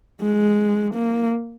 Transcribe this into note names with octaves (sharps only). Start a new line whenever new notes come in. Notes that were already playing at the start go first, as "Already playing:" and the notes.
G#3
A#3